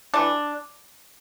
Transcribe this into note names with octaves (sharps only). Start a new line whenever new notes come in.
E3 A3 D4